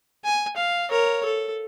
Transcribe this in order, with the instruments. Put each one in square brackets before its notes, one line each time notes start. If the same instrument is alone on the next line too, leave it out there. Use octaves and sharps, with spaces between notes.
[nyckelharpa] G#5
F5
A#4 C#5
A4